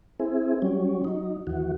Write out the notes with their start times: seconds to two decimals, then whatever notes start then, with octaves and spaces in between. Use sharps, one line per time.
0.20 C4 E4 G#4
0.62 F#3 G3 C#4
1.04 F#3 D#4
1.47 D#2 E3 F#4